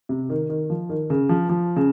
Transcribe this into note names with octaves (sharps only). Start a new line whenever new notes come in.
C3
D#3
D#3
F3
D#3
C#3
F3
F3
C#3